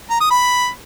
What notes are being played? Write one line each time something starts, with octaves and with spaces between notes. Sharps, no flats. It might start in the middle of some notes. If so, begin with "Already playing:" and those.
A#5
D#6
B5